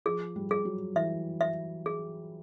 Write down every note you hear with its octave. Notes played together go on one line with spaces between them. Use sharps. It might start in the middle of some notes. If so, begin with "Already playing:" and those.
F3 G#4
G3
G#4
F#3
E3 E5
E5
G#4